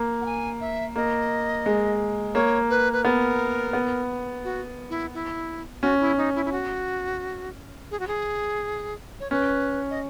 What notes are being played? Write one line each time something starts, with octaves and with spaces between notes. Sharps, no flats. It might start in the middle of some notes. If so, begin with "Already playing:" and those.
Already playing: A#3
F#5
G#5
E5
A#3 D#5
G#3
A#3 C#5
B4
B4
B3 A#4
B3
F#4
E4
E4
C#4 F#4
E4
D#4
E4
E4
F#4
G#4
F#4
G#4
C#5
C#4 B4
D#5